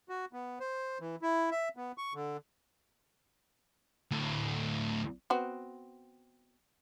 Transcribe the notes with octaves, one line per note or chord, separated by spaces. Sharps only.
F#4
B3
C5
E3
E4
E5
B3
C#6
D3
D2 A2
B3 C4 F#4